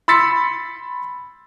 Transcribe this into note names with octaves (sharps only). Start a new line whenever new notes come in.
B5 C6 E6 A6 B6 C#7